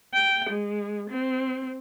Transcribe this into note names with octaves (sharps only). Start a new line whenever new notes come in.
G5
G#3
C4